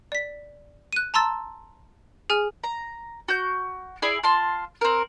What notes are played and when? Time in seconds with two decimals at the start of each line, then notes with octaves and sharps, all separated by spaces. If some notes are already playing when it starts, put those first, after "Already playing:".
0.12 D5 B6
0.93 F#6 D#7
1.14 A5 A#5 C6 E6 A6
2.30 G#4 G#5 F6
2.64 A#5
3.28 F#4 G6
4.02 E4 G#4 D5 G#5
4.24 F4 A5 C6
4.81 C4 A#4